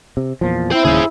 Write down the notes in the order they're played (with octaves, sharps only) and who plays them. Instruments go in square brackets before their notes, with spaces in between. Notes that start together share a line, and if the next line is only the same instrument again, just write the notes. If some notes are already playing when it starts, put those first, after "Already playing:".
[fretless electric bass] C3
E2 A#2 F3
[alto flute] E4 [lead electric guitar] C5 G5
[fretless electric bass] D1 D#2 C#3 [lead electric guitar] G#4 C5